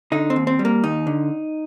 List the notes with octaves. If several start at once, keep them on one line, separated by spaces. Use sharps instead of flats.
D3 D#4
C4
D#2
C4
G3
A#3
D#2 D#4
D3